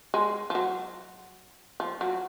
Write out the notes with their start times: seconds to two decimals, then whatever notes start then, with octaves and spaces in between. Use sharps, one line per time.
0.14 G#3
0.50 F3
0.55 F#3
1.80 F3
2.01 F#3